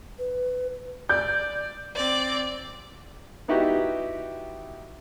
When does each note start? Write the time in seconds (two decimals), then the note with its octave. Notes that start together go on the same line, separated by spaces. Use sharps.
0.19 B4
1.09 D5 G6
1.96 C4 D5
3.48 B3 D#4 E4 F#4 G4